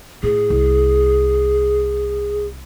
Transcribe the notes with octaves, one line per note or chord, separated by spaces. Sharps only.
A2 G#4
C2